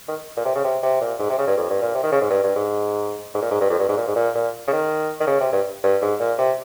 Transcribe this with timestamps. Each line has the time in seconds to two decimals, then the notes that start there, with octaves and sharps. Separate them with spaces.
0.08 D#3
0.37 A#2
0.45 C3
0.56 C#3
0.64 C3
0.83 C3
1.01 A#2
1.19 G#2
1.30 C3
1.39 C#3
1.47 G2
1.58 F2
1.70 G2
1.82 A#2
1.95 C3
2.03 D#3
2.12 C#3
2.21 G#2
2.31 G2
2.44 G2
2.55 G#2
3.35 G#2
3.42 A#2
3.51 G#2
3.61 G2
3.70 F2
3.79 G2
3.89 G#2
3.97 A#2
4.08 G#2
4.16 A#2
4.35 A#2
4.68 C#3
4.73 D#3
5.21 D#3
5.27 C#3
5.40 C3
5.52 G2
5.84 G2
6.02 G#2
6.20 A#2
6.39 C3